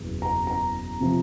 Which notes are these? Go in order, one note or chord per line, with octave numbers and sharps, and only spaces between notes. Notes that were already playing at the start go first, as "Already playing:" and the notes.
Already playing: F#1 E2 B2
A#5
A#5
C3 F3